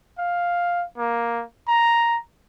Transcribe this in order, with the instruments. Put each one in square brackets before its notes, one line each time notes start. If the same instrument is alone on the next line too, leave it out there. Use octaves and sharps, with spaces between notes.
[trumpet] F5
A#3
A#5